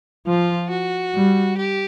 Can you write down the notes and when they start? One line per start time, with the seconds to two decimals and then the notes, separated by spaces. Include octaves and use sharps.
0.27 F3 F4
0.70 F#4
1.14 G3
1.57 G4